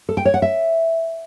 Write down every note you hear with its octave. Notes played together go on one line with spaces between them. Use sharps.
A4
G5
C#5
F#5
E5